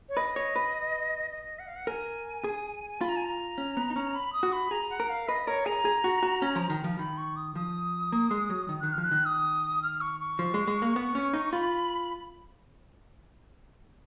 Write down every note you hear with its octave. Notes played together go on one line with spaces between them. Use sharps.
C#5
B4 D#5
C#5
B4
D#5
F#5
F5
F#5
A#4 G#5
G#4
F4 B5
A#5
G#5
A#5
C#4
B3
D#4
C#4
B5
D#6
F#4
B5
G#4 A#5
F#5
A#4
F5
B4 D#5
A#4 C#5
G#4 A#5
G#4
F#4
F#4
C#4
F3
D#3
F3
D#3 B5
C#6
D#6
F3 D#6
A#3
G#3
F#3
D#3
D#3 F#6
F6
F3
F#6
D#3
D#6
F6
C#6
C#6
F3
G#3
G#3
A#3
B3
C#4
D#4
F4 B5